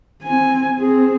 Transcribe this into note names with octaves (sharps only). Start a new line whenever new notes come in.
C4 G#5
C4 G#4